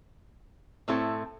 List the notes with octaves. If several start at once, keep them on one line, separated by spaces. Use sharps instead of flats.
A2 A3 C4 E4 A4